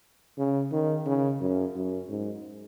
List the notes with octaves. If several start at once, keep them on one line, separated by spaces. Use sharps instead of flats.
C#3
D#3
C#3
F#2
F#2
G#2